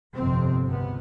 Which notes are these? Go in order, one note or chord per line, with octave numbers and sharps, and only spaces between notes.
G1 F2 C3 C4
C#2 C3 B3